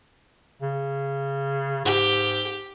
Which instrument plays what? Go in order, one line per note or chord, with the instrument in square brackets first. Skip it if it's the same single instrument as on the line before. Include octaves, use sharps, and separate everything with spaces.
[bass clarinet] C#3
[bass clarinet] G#2 [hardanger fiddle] G4